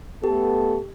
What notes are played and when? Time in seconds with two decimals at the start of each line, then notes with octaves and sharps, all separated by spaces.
0.24 A3 B3 G4 A4